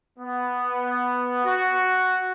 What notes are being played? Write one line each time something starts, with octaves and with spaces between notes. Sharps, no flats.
B3
F#4